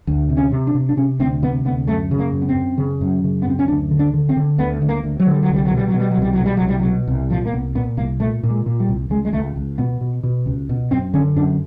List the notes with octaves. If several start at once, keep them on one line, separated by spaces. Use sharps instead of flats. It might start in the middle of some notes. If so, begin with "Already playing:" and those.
D2
C3
C#4
C3
D4
C3
D4
C3 C#4
D2 C4
C3 B3
D2 B3
F#2 A3
C#3
A#3
F#2
B3
C4
F#2
C#3
F#2
C#3
B3
F#2 C4
C#4
D2 D4
D3
D4
D3
C4
D3
D2 B3
D2
A#3
D2
F#3
D3 G3
F#3
C2 G3
F#3
B2
G3
F#3
B2
G3
F#3
C2 G3
F#3
B2
G3
C2 F#3
G3
F#3
B2
C2
A#2 F3
A#3
C2 B3
A#2 B3
C2 A#3
A#2 A3
A#2
G#3
A#2
G3
C2
C#2 G#3
G#3
C#2 A3
C#2
B2 B3
B2
B2
C#2
B2
F#2 C4
D3 C#4
F#2 D4